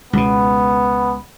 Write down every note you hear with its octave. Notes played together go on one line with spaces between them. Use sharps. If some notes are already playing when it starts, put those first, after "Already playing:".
C#2 B2 B3